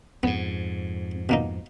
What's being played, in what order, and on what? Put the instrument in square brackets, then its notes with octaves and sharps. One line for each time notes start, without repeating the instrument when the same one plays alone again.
[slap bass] F2 G#2 [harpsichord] B3
[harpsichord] B2 A#3 D#4